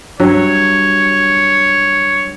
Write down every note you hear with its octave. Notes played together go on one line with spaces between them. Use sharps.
G2 F#3 C#5 E5